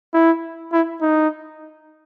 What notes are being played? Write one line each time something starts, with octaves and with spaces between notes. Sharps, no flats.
E4
E4
D#4